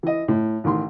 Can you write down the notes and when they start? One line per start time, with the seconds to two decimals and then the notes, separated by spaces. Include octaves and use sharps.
0.03 E3 D#5
0.28 A2
0.64 A1 D#3 C6